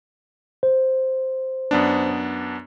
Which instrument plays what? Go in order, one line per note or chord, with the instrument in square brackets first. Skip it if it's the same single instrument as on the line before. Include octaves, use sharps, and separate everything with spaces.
[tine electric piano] C5
[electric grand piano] F#2 B3 D4